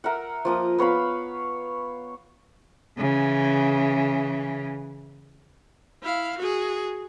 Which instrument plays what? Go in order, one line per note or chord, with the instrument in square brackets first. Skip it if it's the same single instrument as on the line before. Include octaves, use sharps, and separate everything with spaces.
[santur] A#4 E5 F#5
F3 A#3 D#6
B3 C#5 F5 B5
[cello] C#3 E3
[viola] E4 F5
F#4 G#4